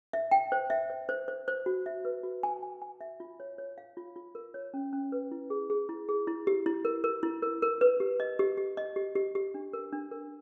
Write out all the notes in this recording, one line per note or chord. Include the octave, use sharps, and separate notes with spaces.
E5
G5
C5
E5
C5
C5
C5
C5
F#4
E5
B4
F#4
G#5
G#5
G#5
E5
F4
C#5
C#5
F5
F4
F4
A#4
C#5
C#4
C#4
B4
E4
G#4
G#4
E4
G#4
E4
G4
E4
A#4
A#4
E4
A#4
A#4
B4
G4
D#5
G4
G4
D#5
G4
G4
G4
D4
A#4
D4
A#4